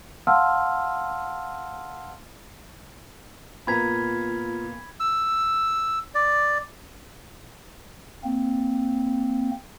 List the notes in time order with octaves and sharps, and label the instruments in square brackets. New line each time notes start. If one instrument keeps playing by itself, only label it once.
[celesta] F5 F#5 A5 C6 E6 F6
[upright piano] A#2 B3 A#5 [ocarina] F4 [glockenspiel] B5 G#6 B6
[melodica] E6
D5
[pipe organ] A#3 C4